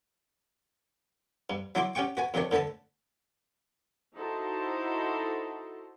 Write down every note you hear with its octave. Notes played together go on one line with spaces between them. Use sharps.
G2
F#3 E4 F#4 C6 D6
C#4 G4 F#5 G5 C#6
F#4 B4 G#5
F2 C3 D#3 D4 C#5
A2 D3 A4 B4 A5
D#4 E4 F#4 A4 C5